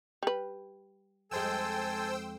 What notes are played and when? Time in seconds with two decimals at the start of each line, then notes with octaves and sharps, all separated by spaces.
0.23 G3 B4
1.31 F2 G#3 A4 C5 G5 G#5 E6